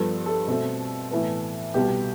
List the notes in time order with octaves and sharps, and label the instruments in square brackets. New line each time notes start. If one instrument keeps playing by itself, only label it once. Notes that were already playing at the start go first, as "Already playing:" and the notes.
Already playing: [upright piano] G2 F3 B3 A4
A4
B2 A3 C4
A2 E3 B3
C2 B2 B3 G4